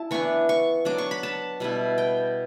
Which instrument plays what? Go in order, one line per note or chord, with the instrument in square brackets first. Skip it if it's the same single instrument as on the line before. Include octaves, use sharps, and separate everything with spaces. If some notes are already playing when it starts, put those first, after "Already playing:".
Already playing: [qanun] E4 A5
E3 B3 D4 C#6
C#6
F#3 B3 D4 D6
C#6
B5
A5
B2 G3 B3 E4
G5